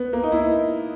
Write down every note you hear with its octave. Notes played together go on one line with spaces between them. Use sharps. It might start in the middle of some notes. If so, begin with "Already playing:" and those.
Already playing: B3
A#3
D#4
E4